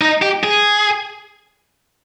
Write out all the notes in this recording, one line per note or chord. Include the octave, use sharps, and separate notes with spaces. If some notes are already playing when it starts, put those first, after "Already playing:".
D#4
G4
G#4